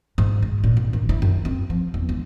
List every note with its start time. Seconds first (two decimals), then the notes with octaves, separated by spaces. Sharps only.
0.18 G#2
0.43 G#3
0.64 A#2
0.77 G#1
0.93 D#3
1.09 E4
1.22 F#2
1.45 C4
1.70 F3
1.94 E2
2.09 G#3